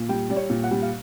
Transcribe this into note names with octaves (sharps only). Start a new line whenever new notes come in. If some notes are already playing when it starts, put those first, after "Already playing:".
Already playing: A#2
G3 G5
G3 D5
C#5
A#2
F#5
G3
F5